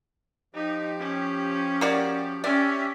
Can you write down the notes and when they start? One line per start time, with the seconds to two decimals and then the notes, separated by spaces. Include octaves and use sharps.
0.55 F3 D#4 G4
0.99 C#4
1.81 A#3 F#4 D5
2.44 C#4 G4 D5 E5